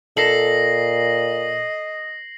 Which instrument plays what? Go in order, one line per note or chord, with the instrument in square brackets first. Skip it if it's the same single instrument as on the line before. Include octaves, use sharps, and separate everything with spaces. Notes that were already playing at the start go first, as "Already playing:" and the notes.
[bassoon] A#2 [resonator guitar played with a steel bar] A4 [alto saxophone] D#5 [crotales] A#6 C7 F#7